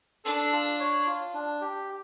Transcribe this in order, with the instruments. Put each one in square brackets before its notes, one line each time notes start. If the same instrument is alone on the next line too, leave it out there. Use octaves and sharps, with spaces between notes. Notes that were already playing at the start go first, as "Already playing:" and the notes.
[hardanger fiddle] D4 [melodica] A4
[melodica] F4
C#5
F4
D4
G4